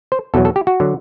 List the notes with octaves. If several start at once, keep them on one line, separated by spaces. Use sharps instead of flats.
C5
E2 B2 F#3 A4
A4
G4
F#4
D3 F#3